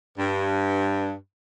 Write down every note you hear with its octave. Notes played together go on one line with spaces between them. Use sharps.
G2